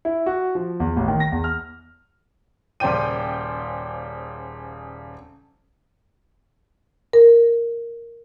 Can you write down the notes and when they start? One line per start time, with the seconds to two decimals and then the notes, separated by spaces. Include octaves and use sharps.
0.05 E4
0.26 F#4
0.55 F3
0.80 E2
0.97 A1
1.08 D#3
1.20 A#6
1.32 E2
1.44 F6
2.80 D#1 C#3 C5 D5 G5 D#7
7.13 A#4